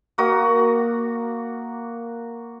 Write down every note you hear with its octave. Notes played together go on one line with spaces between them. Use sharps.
A#3 F#4 D#6